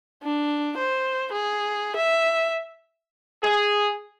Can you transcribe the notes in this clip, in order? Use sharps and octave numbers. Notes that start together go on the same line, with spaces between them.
D4
C5
G#4
E5
G#4